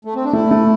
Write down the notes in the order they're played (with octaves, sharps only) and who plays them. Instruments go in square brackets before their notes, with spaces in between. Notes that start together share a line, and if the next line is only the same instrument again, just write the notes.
[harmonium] A3
C4
D4
[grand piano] A3 [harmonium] E4
[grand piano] A3